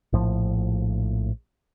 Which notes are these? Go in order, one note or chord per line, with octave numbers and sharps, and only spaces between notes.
A#1 A2 F3